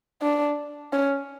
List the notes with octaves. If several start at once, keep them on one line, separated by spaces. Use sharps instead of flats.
D4
C#4